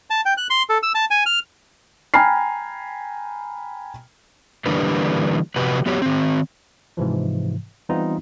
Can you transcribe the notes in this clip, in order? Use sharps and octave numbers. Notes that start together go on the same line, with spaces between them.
A5
G5
F#6
C6
A4
E6
A5
G#5
F6
G5 G#5 A#5 B5 F6 C7
D3 E3 G3 A#3 D4 B4
C3 F3 F#4 G4 B4
F#3 B3 F#4 G4 C#5
D#3 C4
G#2 C3 E3 F3
E3 G3 B3 C4 D#4 F4